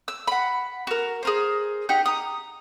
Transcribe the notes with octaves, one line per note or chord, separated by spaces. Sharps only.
E6
F#5 B5
F#4 A#4
G#4 A#4 C5
D#4 G4 F#5 G6
A#5 D#6